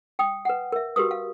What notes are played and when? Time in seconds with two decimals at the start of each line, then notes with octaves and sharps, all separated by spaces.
0.19 G5 D#6
0.45 B4 F#5
0.72 A#4 E5
0.96 F#4 G4 A#4 B4 D#6
1.11 F5